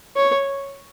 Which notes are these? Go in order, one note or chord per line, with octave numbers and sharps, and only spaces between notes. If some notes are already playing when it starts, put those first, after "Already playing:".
C#5